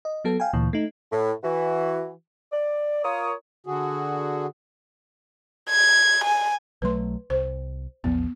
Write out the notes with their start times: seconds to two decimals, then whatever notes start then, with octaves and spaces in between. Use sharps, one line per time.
0.05 D#5
0.25 F#3 B3 A4
0.40 F5 G5 G#5
0.53 D2 A#2 E3
0.73 A3 D#4
1.12 A2
1.44 E3 F#4
2.52 D5
3.04 F4 A#4 C#5 D#6
3.67 D3 F#4 G#4
5.70 G#6
6.24 G#5
6.82 B1 F#3 A3 B4 C6
7.30 C2 C5
8.04 A#1 E2 F3 B3